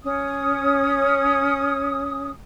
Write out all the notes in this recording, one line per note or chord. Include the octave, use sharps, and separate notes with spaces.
C#4 D#6